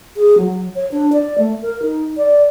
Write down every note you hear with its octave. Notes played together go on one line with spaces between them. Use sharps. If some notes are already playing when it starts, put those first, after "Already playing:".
G#4
F#3
C#5
D4
D5
A3
A#4
D#4
D5